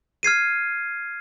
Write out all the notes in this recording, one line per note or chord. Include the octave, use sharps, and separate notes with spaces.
F6 G#6 C7 D#7